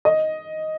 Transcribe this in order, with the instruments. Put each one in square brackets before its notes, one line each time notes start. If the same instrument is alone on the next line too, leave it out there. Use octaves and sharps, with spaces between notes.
[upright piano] D#5